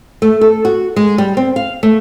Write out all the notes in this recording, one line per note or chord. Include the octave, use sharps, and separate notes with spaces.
A3
A4
F#4
G#3
G3
C4
F5
A3